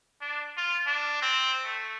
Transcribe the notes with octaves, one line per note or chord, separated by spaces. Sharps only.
D4
F4
D4
C4
A3